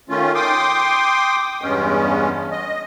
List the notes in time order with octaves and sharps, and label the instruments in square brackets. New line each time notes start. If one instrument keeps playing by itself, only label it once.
[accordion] D#3 A3 C#4 F4
G5 C6 D6 D#6
E2 G2 G#3 B3 C#4
D#5